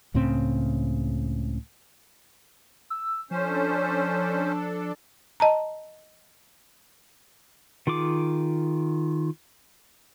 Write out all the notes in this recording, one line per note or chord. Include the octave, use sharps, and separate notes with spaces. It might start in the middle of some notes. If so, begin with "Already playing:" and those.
C#2 A2 C#3 C4
E6
F3 C#4 D4 A4 C5
D#5 A5 A#5
D#3 F4 G#4 D6